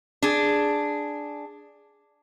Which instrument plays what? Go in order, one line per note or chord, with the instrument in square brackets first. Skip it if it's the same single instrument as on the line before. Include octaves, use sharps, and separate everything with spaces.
[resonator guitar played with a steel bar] D4 G#4